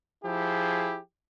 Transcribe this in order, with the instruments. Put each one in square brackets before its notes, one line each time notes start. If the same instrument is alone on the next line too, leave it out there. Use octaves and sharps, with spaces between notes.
[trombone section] F3 E4 G4 G#4